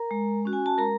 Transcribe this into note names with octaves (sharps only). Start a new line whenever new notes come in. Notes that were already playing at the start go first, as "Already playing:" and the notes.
Already playing: A#4 A#5
G#3
C#4 F#4
G#5
A5
G#3 A#4 A#5